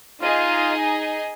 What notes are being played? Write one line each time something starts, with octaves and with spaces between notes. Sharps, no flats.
D#4 F4 G#4 D#5 G#5